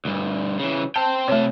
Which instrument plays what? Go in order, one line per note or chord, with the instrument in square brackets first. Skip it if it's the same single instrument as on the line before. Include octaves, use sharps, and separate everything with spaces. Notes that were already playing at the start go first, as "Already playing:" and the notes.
[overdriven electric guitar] D2 G2
C#3 E3
[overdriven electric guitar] C5 G5 [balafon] A5
[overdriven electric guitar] C3 A5 [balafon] A3 C#5